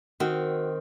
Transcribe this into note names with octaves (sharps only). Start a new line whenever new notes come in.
D#3 C4 F#4